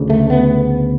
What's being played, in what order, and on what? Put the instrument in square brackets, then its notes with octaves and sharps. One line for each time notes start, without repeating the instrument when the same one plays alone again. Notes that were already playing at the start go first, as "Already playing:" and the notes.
Already playing: [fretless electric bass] D2 C#3
A3
B3